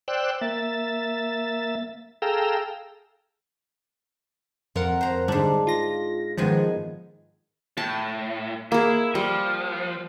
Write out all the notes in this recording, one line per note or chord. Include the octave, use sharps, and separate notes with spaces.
C5 D5 G5 E6 F#6
A#3 E5 A6
G#4 A4 F5 G5 A#5 E6
F2 F4 A#4 F#5
C5 A#5
G#2 D3 G3 D4
F4 A#6
G#2 D#3 F3 G#3 B3 G#5
A2 A5
A#3 E4 G#4
F3 G3